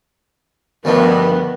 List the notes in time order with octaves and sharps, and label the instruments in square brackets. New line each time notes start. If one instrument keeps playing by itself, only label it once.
[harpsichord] D2 D#3 F3 [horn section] G2 [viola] B3